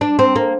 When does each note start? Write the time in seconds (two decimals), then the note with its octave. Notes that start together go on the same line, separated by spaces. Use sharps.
0.01 D4
0.19 C4
0.36 A#3